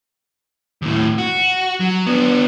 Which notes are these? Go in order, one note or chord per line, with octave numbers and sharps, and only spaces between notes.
D#2 A2
F#4
F#3
B3 D4